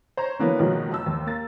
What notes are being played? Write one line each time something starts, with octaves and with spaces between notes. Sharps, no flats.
C5 C#5 A#5
D3 E3 F#3 A#3 B3 C#4
G#2 B2 D#3 F3 F#3 A#3
F#1 A5 E6
D#2
A#3 A6